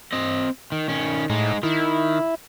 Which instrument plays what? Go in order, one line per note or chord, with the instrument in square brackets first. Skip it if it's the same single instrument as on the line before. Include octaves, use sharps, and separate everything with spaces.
[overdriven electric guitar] C4 D#5
D#3
D#3 C#4
[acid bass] A2 [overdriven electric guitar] G#3 D#4
[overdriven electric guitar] D#3 [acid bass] E4